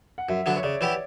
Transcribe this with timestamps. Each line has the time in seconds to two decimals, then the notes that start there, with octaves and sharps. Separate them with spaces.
0.18 F#5
0.29 F#2 E5
0.46 D3 F#3 B3 D4
0.57 C#5
0.63 C#3 D5
0.81 E3 B3 E4 G4